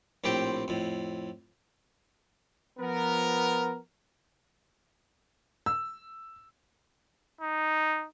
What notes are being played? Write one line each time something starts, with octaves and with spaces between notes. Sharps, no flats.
A#1 A2 C4 G4 C5 G5
F2 A2
F3 B3 A#4
E6
D#4